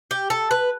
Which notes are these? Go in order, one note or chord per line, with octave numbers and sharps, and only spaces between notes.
G4
A4
B4